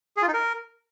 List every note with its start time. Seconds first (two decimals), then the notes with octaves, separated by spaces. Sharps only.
0.17 G#4
0.22 F4
0.28 D#4
0.34 A#4